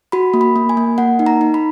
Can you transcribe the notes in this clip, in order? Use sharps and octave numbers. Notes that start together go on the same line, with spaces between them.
F#4 B5
A#3
B5
A#3
G#5
A#3
A#3 F#5
D#4
A#5
D#4
B5